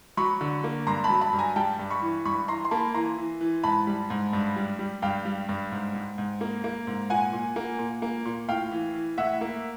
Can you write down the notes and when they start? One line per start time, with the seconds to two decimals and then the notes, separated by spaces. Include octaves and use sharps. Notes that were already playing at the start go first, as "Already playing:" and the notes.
0.17 F#3 B5 C#6
0.41 D3
0.64 A#3
0.87 G2 A#5 C6
1.04 A5 B5
1.10 F#3
1.21 A5 B5
1.33 G2
1.39 G#5 A#5
1.56 G3 G5 A5
1.79 G2
1.91 B5 C#6
2.02 E3
2.25 G2 B5 C#6
2.48 E3 A#5 C6
2.65 C6
2.71 A#3 A5 B5
2.94 E3 A#5 C6
3.18 E3
3.41 E3
3.63 G#2 A5 B5
3.87 G3
4.10 G#2
4.33 G2
4.56 G3
4.79 G3
5.02 G2 F5 G5
5.25 G3
5.49 G2
5.72 G#2
5.95 G#2
6.18 G#2
6.41 A#3
6.64 A#3
6.87 G#2
7.10 A#2 F#5 G#5
7.33 A#2
7.56 A#3
7.79 A#2
8.02 A#3
8.25 A#2
8.48 A2 F5 G5
8.71 E3
8.94 E3
9.18 A2 E5 F#5
9.41 A#3